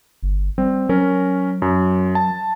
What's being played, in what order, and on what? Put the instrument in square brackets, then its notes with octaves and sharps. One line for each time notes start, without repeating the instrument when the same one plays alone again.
[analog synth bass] G1
[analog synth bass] G3 [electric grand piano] C4
[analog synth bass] F#3 [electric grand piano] C#4 A#4
[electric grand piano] F#2
A5